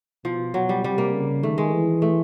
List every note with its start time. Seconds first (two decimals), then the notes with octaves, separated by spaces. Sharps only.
0.24 B2 F3
0.54 F#3
0.69 G3
0.84 C3 G3
0.98 A#3
1.13 C#3
1.43 D#3 A3
1.58 G#3
1.72 E3
2.02 A3